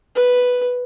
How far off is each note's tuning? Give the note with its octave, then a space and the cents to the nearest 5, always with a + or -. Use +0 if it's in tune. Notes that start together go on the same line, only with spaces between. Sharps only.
B4 +0